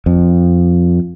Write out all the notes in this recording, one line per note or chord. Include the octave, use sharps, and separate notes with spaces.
F2